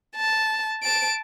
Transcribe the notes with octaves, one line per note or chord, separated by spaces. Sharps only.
A5
A5 D7